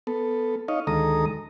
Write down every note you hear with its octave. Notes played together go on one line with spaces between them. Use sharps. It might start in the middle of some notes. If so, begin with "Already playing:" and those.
B3 A4
D#4 C#5 D#5 F5
D2 D#3 G#3 A4 A#5 D#6